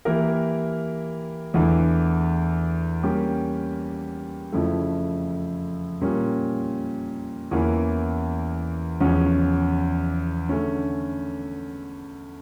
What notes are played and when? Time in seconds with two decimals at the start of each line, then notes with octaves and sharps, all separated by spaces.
0.05 E3 A#3 E4 G4 A#4
1.54 E2 E3 A3 D4
3.03 G3 A#3 C#4 G4
4.53 F2 C#3 F3 A3 E4
6.01 A#2 G3 A#3 C#4
7.51 E2 E3 A#3 C#4
9.00 E2 C#3 F3 C#4
10.49 D3 A3 C#4